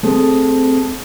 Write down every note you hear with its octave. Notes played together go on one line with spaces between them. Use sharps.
A3 C4 G#4 A4